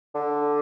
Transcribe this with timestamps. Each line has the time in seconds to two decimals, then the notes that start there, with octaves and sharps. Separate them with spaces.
0.15 D3